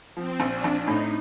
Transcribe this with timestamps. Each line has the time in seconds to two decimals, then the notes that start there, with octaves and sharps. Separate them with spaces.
0.17 F3 C4
0.40 A#1
0.48 D4
0.64 A#1
0.79 D#4
0.88 A2